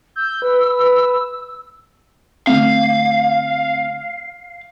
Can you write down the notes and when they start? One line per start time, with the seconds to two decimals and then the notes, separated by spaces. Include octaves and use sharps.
0.16 E6 G6
0.42 B4
2.47 D3 A3 C4 F5